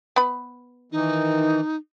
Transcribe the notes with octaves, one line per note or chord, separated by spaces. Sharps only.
B3 B5
D#3 E3 D#4